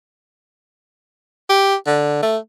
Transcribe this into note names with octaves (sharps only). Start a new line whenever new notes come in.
G4
D3
A3